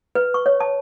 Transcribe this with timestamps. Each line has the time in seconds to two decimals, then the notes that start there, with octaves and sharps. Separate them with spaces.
0.15 B4
0.34 C#6
0.46 C#5
0.60 A5